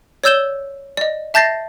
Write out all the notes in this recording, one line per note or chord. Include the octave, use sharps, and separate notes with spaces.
C#5 D5 E6 G6 E7 G7
D5 D#5
E5 A5 G6 A6 A#6 C7